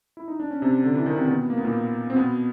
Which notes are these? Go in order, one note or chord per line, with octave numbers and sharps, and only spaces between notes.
E4
D#4
D4
C#4
C3 C4
D3 D4
E3 E4
D#3 D#4
C3 C4
B2 B3
A#3
B3
A#2 A#3
C4
B2 B3